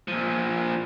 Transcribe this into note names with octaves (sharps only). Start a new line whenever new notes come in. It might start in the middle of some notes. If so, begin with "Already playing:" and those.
A#2 F3